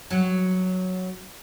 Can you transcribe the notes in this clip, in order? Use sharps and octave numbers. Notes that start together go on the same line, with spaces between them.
F#3